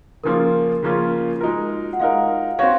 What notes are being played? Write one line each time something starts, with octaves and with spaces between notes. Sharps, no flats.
C#3 F3 A#3 C#4 F4 A#4
C#3 F3 A#3 C#4 F4
F4
G#3 D#4 F#4 A#4
F#5
G#3 D#4 A#4 F5
C4 F#4 C#5 F5